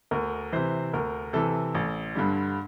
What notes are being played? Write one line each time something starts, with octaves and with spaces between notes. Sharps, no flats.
D2 A#4
C3 E3 C5
D2 A#4
C3 E3 A4
A1
G2 D3 G3